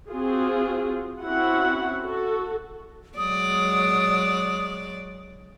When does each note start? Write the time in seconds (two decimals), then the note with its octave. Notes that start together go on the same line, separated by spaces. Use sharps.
0.11 C4 F4 F#4 G#4
1.21 C4 C#4 E4 F#4 F#5
2.04 F#4 A4
3.17 F#3 G#3 D5 D#6